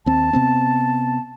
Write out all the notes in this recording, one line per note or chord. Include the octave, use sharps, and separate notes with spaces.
D#2 C4 A5
C3 B3 C4